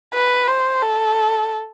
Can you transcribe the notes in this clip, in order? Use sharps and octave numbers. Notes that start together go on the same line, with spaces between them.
B4
C5
A4